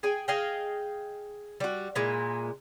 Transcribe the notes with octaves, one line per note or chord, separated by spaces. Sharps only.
G#4 G5 G#5
G#4 D#5 F5 G5
G3 F#4
A#2 G#3 E4